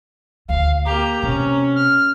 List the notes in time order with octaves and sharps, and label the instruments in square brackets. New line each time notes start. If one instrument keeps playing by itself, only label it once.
[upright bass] D2 [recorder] F5
[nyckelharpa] A#3 G4 [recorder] A#5
[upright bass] C3 [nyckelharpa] C#4
[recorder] F6